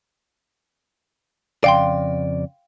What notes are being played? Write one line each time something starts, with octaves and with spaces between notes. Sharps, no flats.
F2 C#3 D5 F5 G5 C6